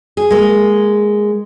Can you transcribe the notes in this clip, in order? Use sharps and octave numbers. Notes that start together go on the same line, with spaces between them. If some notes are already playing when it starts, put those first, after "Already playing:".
G#4
G#3 A#3